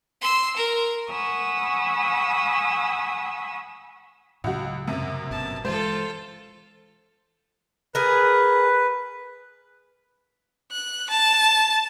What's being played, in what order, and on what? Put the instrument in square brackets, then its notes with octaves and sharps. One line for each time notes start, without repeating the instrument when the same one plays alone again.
[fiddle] C6 E6
A#4
[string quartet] F#5 G#5 B5 C#6 D#6 E6
[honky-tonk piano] C#2 F#4 [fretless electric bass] A2 C#3 F#3
[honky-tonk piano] F#2 C3
[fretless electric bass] G1 B2 [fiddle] A5
[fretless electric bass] E3 G#3 [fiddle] F4 A4 [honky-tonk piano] C5
[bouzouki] G#4 A#4 [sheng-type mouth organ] B4
[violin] F#6
A5